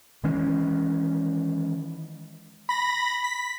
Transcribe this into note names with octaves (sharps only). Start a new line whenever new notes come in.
D#3 E3 G#3 C#4
B5 A#6
B6